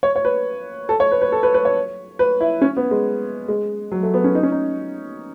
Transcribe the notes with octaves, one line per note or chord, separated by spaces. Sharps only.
C#5
C#5
B4
A4
C#5
B4
B4
A4
B4
B4
C#5
B4
E4
C#4
B3
G#3
G#3
F#3
A3
B3
C#4
D#4
C#4
D#4